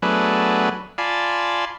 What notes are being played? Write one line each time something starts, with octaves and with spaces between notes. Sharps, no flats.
F#3 A3 B3 D4 G#4 B4
F4 D5 G#5 A5 B5 C6